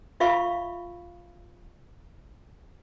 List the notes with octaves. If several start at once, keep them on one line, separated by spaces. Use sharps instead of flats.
F4 E5 F5 B5 C#6